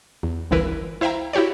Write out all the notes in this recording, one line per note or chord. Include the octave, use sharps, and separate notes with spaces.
E2
G1 C#2 E3 E4 A#4 B4
E4 C5 E5 F5 G5 A#5
E4 F#4 G4 C#5 D5